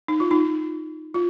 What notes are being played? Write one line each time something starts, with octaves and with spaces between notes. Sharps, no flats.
D#4
F4
D#4
F4